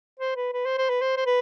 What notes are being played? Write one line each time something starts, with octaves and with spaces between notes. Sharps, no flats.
C5
B4
B4
C5
C5
B4
C5
C5
B4